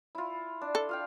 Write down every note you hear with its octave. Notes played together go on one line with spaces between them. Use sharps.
E4 F4
D4
A4
F4 F5 G5